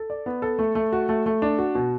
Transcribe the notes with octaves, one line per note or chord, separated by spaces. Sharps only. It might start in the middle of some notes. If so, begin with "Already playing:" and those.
Already playing: A4
D5
B3
A4
A3
A3
F#4
A3
A3
D4
F#4
B2